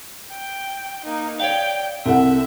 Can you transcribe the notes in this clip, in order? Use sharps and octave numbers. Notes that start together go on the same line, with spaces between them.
G5
A#3 D#4
C#5 D5 F5 G5
C2 C4 A4 E5 F#5